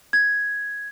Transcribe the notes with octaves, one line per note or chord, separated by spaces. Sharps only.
G#6